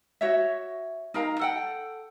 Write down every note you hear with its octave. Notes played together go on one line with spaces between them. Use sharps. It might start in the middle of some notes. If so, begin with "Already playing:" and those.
F#4 C#5 E5
D#4 A#4 F5 A#5
A4 F#5 G5